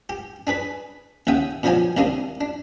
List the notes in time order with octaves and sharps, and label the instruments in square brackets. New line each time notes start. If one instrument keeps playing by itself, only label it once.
[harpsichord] G4
D4 G#4 B4 B5
D#2 C#3 E5 F#5 G5 D#6
B2 D3 F3 F#3 G4 G#5
D#2 C3 A#3 C4 D4 D#6
D4